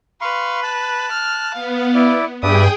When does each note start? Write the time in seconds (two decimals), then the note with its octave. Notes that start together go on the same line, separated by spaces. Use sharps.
0.21 B4 F5 C6 C#6
0.63 A5 F#6
1.12 F6
1.54 B3 F5
1.94 E4 D5
2.43 G2 G#4 B4 D5 E5 G5 D#6